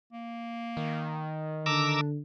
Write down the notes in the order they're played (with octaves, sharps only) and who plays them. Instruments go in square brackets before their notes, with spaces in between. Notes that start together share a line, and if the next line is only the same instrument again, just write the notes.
[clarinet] A#3
[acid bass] D#3
[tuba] D3 [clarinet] D4 [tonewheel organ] A#5 D6 E6